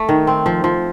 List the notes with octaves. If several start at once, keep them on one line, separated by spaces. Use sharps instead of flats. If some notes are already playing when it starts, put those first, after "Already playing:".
Already playing: A3
D#3
C4
F3
F3